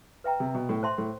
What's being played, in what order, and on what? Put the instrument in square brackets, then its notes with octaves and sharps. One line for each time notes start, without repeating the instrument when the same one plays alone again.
[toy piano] B4 E5 G5 A#5
[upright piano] C3
B2
A2
[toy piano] C5 E5 A5 C6
[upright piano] A2